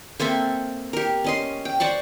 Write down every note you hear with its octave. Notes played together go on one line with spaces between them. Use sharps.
A#3 C4 A4 E5
G4 A#4
C#4 D#5 C6
G5
C5 D5 F#5 C#6